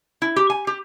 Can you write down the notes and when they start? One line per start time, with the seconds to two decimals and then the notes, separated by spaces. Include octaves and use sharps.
0.22 E4
0.36 G4
0.50 G#5
0.67 G4